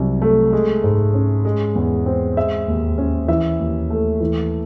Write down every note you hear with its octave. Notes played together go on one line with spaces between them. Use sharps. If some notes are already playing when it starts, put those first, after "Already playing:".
Already playing: C2 F#3
A3
G#3
G#2
C#4
G#3
E2
C4
G#3 E5
D#2
C#4
E3 E5
D#2
A3
E3